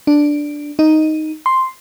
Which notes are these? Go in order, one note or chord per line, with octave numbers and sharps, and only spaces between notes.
D4
D#4
C6